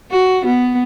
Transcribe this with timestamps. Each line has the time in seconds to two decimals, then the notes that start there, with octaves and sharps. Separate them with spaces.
0.11 F#4
0.46 B3